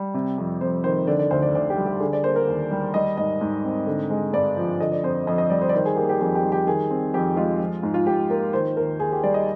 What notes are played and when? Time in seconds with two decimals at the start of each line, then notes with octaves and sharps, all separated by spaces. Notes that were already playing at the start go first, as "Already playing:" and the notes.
Already playing: G3
0.14 C3
0.38 F2
0.61 F2 C5
0.84 D#3 C5
1.07 D3 D5
1.19 D5
1.31 D2 C5
1.42 D5
1.55 D2 D5
1.70 G4
1.78 G3
1.86 G4
2.00 D3 G#4
2.13 D5
2.24 A#3 C5
2.36 A#4
2.47 D#2
2.71 G3
2.94 G3 D#5
3.17 G#2 D#5
3.41 G#2
3.64 C4
3.87 D3
4.10 G#3
4.33 G2 D5
4.57 F3
4.80 D3 D#5
4.92 D5
5.03 F2 C5
5.27 F2 D#5
5.38 D#5
5.50 G3 D5
5.61 C5
5.69 D5
5.74 D#3 C5
5.85 G#4
5.96 A#3 G4
6.09 G4
6.21 F2 G#4
6.35 G4
6.44 G3
6.52 G4
6.67 D#3 G#4
6.91 C4
7.14 F2 G4
7.36 G#3 F4
7.60 F3
7.83 G#2
7.94 F4
8.07 G#2 G4
8.30 A#3 A#4
8.53 D#3 C5
8.76 D#2 A#4
8.99 D#2 G#4
9.12 G4
9.24 G3 D5
9.34 D#5